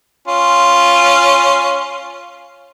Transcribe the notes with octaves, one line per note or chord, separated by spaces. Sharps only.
C#4 F4 C6